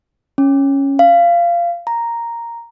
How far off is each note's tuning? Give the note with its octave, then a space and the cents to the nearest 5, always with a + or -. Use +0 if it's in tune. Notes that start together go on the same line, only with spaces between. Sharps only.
C#4 -5
F5 -20
A#5 +0